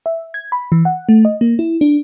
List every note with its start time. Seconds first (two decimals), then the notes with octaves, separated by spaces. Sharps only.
0.06 E5
0.34 G#6
0.52 B5
0.72 E3
0.85 F#5
1.09 A3
1.25 D#5
1.41 A#3
1.59 E4
1.81 D4